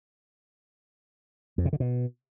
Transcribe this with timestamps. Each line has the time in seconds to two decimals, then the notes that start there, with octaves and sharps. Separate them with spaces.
1.58 F2
1.65 C3
1.73 D3
1.80 B2